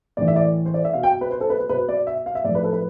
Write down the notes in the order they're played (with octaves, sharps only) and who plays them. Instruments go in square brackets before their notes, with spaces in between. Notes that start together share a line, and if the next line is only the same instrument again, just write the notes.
[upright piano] A2 E3 D5
E5
D5
C5
D5
E5
B2 F5
G5
B4
C5
A4
B4
C5
B2 B4
D5
E5
F5
E5
A2 D5
F3
B4
A4
B4